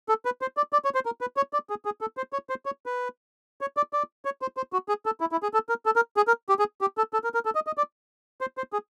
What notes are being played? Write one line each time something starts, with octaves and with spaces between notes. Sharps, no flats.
A4
B4
C5
D5
D5
C#5
C5
A#4
B4
C#5
D5
G#4
G#4
A4
C5
C#5
C5
C#5
B4
C#5
D5
D5
C#5
C5
C5
F#4
G#4
A4
E4
E4
G#4
A4
A#4
A4
A#4
G#4
A#4
G4
G#4
G4
A4
A4
A#4
A#4
A4
D#5
D#5
D5
C5
C5
G#4